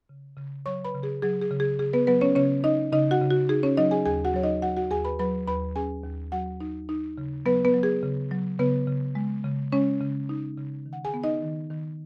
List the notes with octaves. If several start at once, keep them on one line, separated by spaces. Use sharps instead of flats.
C#3
C#3
F#3 C#5 C#6
B4 B5
C#3
G#4
F#3 G#4
G#4
C#3
G#4
C#3 G#4
B3 B4
F#3 B3 B4
C#4 C#5
C#3 C#4 C#5
D#4 D#5
C#3 D#4 D#5
F#4 F#5
C#3
F#4
D#4 G#4
C#4 C#5
F#3 D#4 D#5
G#4 G#5
D#2 G#4 G#5
F#4 F#5
F#3 C#5
D#4 D#5
F#3 F#4 F#5
F#4 F#5
D#2 G#4 G#5
B4 B5
F#3 B4 B5
D#2 B4 B5
C#4 G#4 G#5
D#2
F#3 F#4 F#5
D#4
D#4
C#3
F#3 B3 B4
B3 B4
F#3
G#4
C#3
F#3
C#3 B3 B4
C#3
G#3
C#3
G#3 C#4 C#5
C#3
D#4
C#3
D#3
F#5
G#4 G#5
B3
D#4 D#5
D#3
D#3